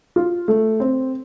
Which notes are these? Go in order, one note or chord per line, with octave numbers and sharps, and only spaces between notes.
F4
A3
C4